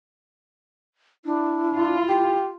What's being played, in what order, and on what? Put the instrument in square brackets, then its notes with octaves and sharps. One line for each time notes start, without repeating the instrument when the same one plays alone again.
[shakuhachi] D4 [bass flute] E4
[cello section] F4
[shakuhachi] G4